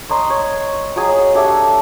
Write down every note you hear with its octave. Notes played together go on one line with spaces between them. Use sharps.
C#5 D#5 A#5 C6
C#5
F#3 G#4 D#5 A#5
D4 G4 A4 E5